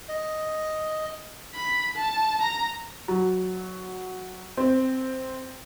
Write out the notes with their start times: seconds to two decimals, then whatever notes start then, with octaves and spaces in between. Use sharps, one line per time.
0.09 D#5
1.55 B5
1.96 A5
2.42 A#5
3.08 F#3
4.57 C4